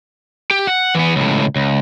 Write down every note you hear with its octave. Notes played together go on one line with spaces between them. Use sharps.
G4
F#5
E3 B3
C#2 A2
C#2